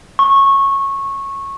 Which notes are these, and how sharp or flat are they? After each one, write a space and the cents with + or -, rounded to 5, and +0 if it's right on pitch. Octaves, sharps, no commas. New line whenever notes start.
C#6 -15